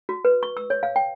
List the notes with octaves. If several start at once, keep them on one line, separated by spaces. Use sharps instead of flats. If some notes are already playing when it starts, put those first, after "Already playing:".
F#4
B4
C#6
E6
C#5
F5
G5